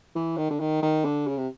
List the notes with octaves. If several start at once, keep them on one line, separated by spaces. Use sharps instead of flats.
E3
D#3
D3
D#3
D#3
D3
C#3
C3